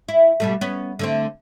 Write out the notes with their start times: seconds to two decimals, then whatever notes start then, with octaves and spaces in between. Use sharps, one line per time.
0.08 E4
0.40 B2 G3 A3
0.61 B3 C#4
0.99 D3 A3 C4